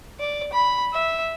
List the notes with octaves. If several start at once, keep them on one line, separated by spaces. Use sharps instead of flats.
D5
B5
E5